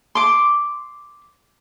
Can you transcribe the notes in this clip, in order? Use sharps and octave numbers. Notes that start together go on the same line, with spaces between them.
C6 D6